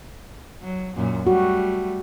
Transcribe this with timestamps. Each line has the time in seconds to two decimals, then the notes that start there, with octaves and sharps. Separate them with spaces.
0.62 F#3
0.96 F#2 A#2
1.27 G3 A3 F#4